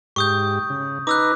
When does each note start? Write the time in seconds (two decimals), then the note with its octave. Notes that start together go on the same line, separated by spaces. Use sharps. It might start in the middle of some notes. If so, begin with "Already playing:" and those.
0.16 G#2 G4 C#6 D#6 G6
0.70 C#3
1.07 D#4 B4 A#5 D6 E6 F#6